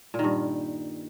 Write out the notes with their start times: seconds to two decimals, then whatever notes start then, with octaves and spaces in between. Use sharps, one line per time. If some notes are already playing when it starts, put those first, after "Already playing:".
0.14 A#2
0.19 D#3
0.24 G2